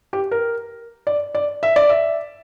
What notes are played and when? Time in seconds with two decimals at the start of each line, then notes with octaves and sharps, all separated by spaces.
0.13 G4
0.31 A#4
1.07 D5
1.35 D5
1.63 E5
1.76 D5
1.89 E5